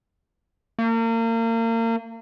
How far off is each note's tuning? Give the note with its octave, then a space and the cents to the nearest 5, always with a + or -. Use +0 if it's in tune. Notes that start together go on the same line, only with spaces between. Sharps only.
A#3 -35